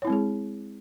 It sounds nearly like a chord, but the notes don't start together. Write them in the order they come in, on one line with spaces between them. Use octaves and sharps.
C#5 E4 C4 G#3 G#4